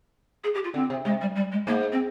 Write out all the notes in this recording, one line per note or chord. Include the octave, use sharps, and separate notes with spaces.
G#4
G4
F4
D3 C4
C3
C3 G#3
G3
G3
G#3
G#2 A#3
C4